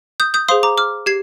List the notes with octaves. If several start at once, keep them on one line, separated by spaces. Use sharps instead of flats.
D#6 G6
D#6 G6
G#4 C5 F5 C6 D#6
A#5 D6
D6 F6
G4 G#6 C7